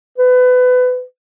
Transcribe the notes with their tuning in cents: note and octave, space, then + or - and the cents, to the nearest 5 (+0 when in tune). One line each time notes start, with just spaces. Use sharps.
B4 +25